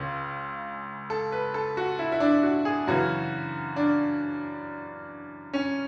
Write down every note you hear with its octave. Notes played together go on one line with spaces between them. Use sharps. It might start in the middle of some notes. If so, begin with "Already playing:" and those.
Already playing: C#2 C#3
A4
B4
A4
F#4
E4
E4
D4
F#4
G#4
F#2 C#3 E3 F#4
D4
C#4